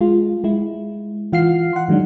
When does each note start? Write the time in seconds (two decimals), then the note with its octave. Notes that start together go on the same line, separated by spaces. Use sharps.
0.01 G#3 F4
0.44 G#3 E4
1.33 E3 F4 F5 F#5 F6 C7
1.73 F#5 C6
1.88 D#3 F#3 G#3 D4 D#4